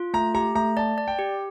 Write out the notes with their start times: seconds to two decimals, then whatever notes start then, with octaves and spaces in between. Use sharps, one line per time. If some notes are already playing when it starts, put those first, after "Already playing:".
Already playing: F4
0.14 A3 A#5
0.34 G4 A#5
0.55 A3 A#5
0.77 D5 A5
0.98 D5
1.08 G5
1.19 G4